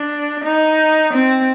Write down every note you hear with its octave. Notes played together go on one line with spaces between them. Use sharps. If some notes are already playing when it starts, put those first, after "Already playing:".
Already playing: D4
D#4
C4